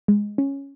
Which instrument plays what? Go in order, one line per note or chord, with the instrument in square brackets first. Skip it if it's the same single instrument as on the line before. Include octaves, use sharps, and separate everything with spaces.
[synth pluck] G#3
C#4